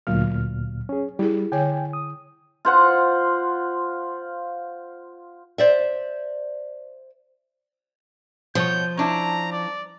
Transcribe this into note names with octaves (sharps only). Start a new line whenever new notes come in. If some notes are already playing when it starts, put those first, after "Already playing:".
D2 A#2 F#3 F6
C#4 G#4
G3 E4 G#4
D3 C#5 G5 G#5
D#6
F4 C5 F#5
C5 D5 E5
B2 F3 C#5 G6
C#4 D4 E4 A#5
D5